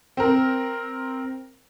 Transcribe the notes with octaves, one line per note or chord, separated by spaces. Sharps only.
C4 A#4